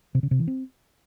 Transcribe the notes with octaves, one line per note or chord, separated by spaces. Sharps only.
C3
C#3
C3
E3
C4